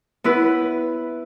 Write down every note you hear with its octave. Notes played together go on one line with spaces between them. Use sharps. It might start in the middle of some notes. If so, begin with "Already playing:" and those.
B3 E4 B4